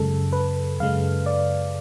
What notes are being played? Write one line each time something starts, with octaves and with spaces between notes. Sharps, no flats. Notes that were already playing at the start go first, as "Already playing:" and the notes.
Already playing: F#2 C#3 G#3 A4
B4
F#2 C#3 G#3 F5
D5